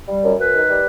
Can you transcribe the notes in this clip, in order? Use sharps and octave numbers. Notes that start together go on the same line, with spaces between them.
G3
F#2
F#2 B4
D#3
G3